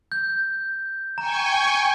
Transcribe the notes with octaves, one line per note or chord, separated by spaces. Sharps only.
G6
G5 G#5 A#5 C#6